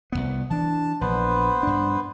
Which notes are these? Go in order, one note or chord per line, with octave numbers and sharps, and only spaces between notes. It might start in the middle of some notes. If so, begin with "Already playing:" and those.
C2 F2 B3
E3 D4 A5
A#1 B3 B4 C5
G2 D4